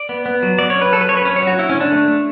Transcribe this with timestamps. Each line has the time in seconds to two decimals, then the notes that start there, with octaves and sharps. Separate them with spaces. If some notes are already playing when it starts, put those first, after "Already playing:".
Already playing: D5
0.09 B3
0.26 B3
0.43 F#3
0.58 F#3 D5
0.70 C#5
0.76 C#4
0.82 B4
0.92 F#3 A4
1.01 B4
1.08 F#3 C#5
1.17 B4
1.25 C#4 C#5
1.36 C#5
1.42 F#3 F#4
1.59 C#4 E4
1.70 C#4
1.75 D3
1.80 D4
1.92 A3
2.08 A3